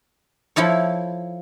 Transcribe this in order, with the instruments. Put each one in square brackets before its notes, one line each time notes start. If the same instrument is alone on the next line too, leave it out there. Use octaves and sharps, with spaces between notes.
[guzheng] F3 E4 A4 C#5